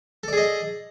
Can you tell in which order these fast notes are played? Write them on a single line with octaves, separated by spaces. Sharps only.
A4 D5 G#4 D#5